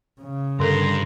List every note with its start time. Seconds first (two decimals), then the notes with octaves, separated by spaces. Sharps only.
0.22 C#3
0.60 G2 D3 A4 A#4 A#5 C6